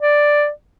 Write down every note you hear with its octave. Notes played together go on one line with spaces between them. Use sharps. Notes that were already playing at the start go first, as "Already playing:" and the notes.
D5